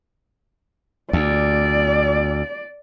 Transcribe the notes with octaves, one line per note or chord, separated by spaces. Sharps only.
D2 D5